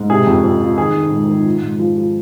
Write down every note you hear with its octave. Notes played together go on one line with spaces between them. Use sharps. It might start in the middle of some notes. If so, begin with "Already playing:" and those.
Already playing: G#2
C3 G#4
F2
F2
F3
D#3 G#4
D#3
G#2
D#3
F3
G#2
F3
F3